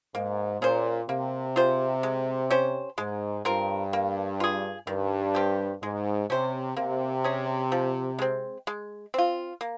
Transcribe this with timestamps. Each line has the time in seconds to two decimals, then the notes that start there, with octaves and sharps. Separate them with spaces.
0.14 G#2 A#3
0.61 A#2 C#4 G#4 C5
1.09 C3 A#3
1.56 F4 G#4 C5
2.03 G#3
2.50 C#4 G4 C5
2.98 G#2 G#3
3.45 G2 C4 F4 A#4
3.93 A#3
4.40 F4 G#4
4.87 G2 D#3
5.35 G3 C4 G4
5.82 G#2 G#3
6.29 C3 C#4 G4 C5
6.77 C3 A#3
7.24 C#4 G#4
7.72 F3
8.19 G#3 C4
8.67 G#3
9.14 C4 F4
9.61 A#3